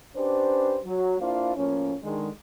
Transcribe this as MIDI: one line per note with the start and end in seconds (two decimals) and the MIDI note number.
0.16 0.78 61
0.16 0.78 62
0.16 0.78 67
0.16 0.78 71
0.16 0.78 72
0.84 1.14 54
1.20 1.55 58
1.20 1.55 62
1.20 1.55 64
1.20 1.55 65
1.20 1.55 72
1.20 1.55 77
1.56 1.95 45
1.56 1.95 53
1.56 1.95 58
1.56 1.95 61
2.02 2.28 50
2.02 2.28 51
2.02 2.28 56